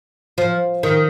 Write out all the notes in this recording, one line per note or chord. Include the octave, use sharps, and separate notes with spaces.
F3
D#3